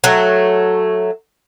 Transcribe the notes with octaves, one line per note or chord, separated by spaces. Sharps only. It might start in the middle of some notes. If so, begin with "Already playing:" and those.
F#3 A3